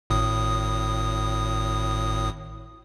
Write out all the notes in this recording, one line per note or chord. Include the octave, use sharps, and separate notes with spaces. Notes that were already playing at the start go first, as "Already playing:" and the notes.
G#1 A2 D#6